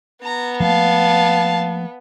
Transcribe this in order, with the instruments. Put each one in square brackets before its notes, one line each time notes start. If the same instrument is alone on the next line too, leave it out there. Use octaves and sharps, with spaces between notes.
[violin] B3 [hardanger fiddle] A#5
[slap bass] F3 A3 A#3 [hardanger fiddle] F5 A5